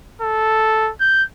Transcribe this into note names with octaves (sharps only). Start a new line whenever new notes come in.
A4
G6